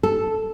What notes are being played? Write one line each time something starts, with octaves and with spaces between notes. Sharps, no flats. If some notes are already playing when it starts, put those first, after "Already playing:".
A4